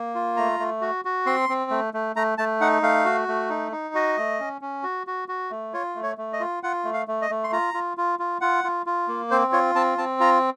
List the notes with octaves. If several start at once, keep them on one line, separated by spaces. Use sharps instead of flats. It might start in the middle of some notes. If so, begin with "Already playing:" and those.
Already playing: A#3
F4
A3 A#5
A3
F#4
F#4
C4 C6
C4
A3
A3
A3 A#5
A3 A5
D#4 F#5
A3 F5
F#4
A3
D#4
D#4
F#4 D#5
A3
C#4
C#4
F#4
F#4
F#4
A3
F4 C#5
A3
C#5
A3
D#5
F4
F4 F#5
A3
F5
A3
D#5
A3
C6
F4 A#5
F4
F4
F4
F4 F#5
F4
F4
A#3
C4 C5
F4 C#5
C4 A5
C4 A5
F4 A#5